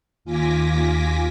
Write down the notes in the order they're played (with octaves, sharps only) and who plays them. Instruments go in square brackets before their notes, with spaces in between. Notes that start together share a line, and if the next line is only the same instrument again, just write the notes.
[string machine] D#2 F4 G#5 D6 A#6 B6